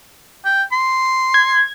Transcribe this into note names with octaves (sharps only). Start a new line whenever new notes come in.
G5
C6
G#6